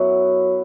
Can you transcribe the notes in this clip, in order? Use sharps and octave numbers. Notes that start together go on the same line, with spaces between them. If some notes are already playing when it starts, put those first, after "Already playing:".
Already playing: F#2 F#3 B3 E4